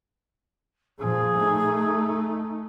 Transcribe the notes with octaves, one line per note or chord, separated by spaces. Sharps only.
A#2 F3 G#4
A3 D#4